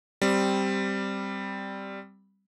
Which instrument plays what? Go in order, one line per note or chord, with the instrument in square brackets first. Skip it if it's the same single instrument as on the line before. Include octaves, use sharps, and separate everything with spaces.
[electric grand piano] G3 C4